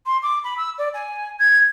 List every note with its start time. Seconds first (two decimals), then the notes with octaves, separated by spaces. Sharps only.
0.06 C6
0.23 D6
0.44 B5
0.57 E6
0.78 D5
0.94 G#5
1.39 G#6